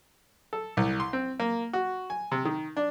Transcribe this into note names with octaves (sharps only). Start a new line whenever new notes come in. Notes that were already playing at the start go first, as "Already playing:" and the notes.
A4
C2
C6
C4
A#3
F#4
G#5
C3
D#3
D4